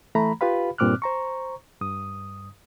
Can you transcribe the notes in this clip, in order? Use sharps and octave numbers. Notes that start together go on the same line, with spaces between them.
E3 A3 A#5 B5
F4 G4 B4 F5 B5
G2 A#2 C4 D6 F6 F#6
C5 A#5 C#6
G2 D#6